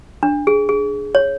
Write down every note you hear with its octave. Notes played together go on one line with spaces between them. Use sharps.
D4
G#4
G#4
C#5